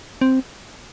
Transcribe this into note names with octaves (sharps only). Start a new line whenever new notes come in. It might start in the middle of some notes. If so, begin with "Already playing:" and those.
C4